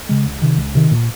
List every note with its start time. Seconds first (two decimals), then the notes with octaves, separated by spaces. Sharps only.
0.09 C#3 G#3
0.26 C#2
0.42 C3 D#3
0.58 C#2
0.75 C3 D#3
0.91 A#2